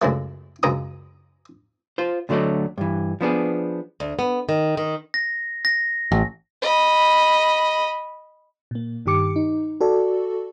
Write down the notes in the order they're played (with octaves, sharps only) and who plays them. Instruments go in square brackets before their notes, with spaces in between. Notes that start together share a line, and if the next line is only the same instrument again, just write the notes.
[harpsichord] C#2 F#2 F#3 A3
C#2 F#2 A#5 D#6
[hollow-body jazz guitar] F4 C5
D2 D3 F#3 A3 D5 D#5
G2 E3
F3 B3 D4 G#4
[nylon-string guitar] D2
B3
D#3
D#3
[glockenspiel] A#6
A#6
[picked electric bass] A1
[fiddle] D#5 B5
[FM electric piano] A#2 A#3
G2 D#3 G4 D6 C#7
D#4
F#4 A4 D5